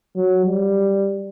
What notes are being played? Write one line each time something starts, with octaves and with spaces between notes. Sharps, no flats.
F#3
G3